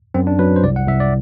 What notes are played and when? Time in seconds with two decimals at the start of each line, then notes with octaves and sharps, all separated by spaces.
0.14 F#2 C4
0.27 D4
0.39 F#3 B4
0.56 C5
0.63 C2 D5
0.76 F#5
0.87 C2 E5
1.00 D5